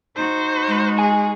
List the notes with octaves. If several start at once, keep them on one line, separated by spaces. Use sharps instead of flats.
D#4 F#4 C5
G#3
G#4 G#5